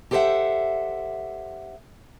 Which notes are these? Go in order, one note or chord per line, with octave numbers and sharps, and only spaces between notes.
G4 A4 C5 C#5 E5 F#5